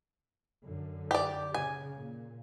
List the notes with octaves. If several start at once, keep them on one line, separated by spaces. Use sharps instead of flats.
F#2 D3
G4 D5
C#3 G#5
A#2